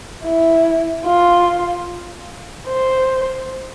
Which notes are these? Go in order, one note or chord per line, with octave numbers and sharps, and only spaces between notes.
E4
F4
C5